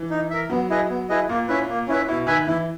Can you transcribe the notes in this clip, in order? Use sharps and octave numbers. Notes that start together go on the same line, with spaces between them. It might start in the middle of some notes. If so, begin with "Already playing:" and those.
Already playing: E3
D#4
A#4 E5
F#3 B3
E4 G#4 B4 D#5
B3
E4 G#4 B4 D#5
A#2 A#3
C#4 E4 B4 E5
A#3
C#4 E4 B4 E5
B2 E4
D#3 B4 E5 G#5
E3 E4